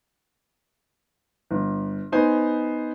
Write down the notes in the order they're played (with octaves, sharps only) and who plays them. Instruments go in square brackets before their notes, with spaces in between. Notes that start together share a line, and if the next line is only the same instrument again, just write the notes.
[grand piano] G1
B3 D#4 C5 G#5